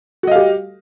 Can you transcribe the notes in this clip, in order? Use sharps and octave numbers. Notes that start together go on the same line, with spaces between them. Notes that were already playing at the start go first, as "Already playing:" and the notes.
F#4 G4 D#5 F5